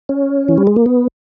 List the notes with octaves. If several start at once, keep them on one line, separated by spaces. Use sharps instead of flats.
C#4
E3
G3
G#3
A#3
B3